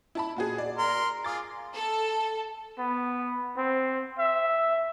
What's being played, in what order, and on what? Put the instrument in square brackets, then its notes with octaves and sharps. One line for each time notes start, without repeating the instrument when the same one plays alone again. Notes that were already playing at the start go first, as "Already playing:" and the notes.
[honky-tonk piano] E4 A5 B5
A#2 F#4 G#4
D5
[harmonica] A#4 C6
[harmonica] F4 G#4 [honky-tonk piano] D6 A6
[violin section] A4
[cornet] B3
C4
E5